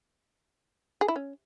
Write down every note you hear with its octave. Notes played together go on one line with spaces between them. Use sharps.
G#4
E4
C#4